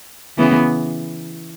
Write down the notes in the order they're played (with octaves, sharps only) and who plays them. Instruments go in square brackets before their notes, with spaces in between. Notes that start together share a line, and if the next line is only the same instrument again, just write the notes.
[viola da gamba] C#3 E3 [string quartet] B3